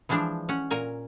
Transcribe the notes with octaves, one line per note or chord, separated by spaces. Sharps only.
E3 F3 G#3 D4
C#4 F#5
A#2 A#4 G#5